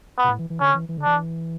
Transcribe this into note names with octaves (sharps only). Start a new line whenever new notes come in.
B3
B2
A2
E3
E3
D3 C#4
E3
E3
D3
E3 D4